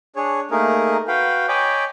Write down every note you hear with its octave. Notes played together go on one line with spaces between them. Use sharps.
D4 G#4 C#5
A3 A#3 D#4 G#4 A#4
F#4 B4 F5 G5
C#5 D#5 G5 G#5 B5 D6